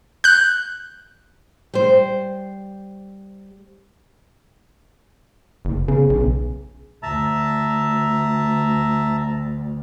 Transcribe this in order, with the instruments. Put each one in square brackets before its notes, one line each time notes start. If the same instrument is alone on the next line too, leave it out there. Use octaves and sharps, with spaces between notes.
[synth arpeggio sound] F#6 G6
[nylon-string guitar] G3 C5
[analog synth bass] F#1
[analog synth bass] C#3 [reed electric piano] B3 C#4 G#4
[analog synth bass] B1
[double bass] D2 [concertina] E5 A5 A#5